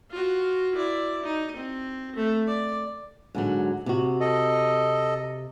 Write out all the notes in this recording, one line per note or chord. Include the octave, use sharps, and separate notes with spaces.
F4 F#4
E4 D5
D#4
C4
A3
D5
G#2 D3 F#3
C3 F#4
A4 D#5